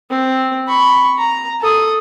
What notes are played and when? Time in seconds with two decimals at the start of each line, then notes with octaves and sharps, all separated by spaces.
0.10 C4
0.68 B5 C#6
1.18 A#5
1.61 A4 D#6